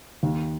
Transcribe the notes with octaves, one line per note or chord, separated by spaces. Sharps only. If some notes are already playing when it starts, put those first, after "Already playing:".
D#2